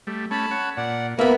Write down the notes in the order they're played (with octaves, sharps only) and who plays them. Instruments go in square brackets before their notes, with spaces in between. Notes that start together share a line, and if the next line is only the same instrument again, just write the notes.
[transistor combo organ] G3 A3
[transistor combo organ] A3 C#4 [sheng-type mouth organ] A5 B5
[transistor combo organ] C#5 F#5
[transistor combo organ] A#2 [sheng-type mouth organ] D5 F#5
[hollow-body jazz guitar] A#3 B3 [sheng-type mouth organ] A#4 E5 B5